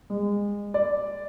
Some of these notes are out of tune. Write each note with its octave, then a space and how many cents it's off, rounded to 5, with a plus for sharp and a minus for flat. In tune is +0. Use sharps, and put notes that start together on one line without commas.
G#3 -25
D5 +0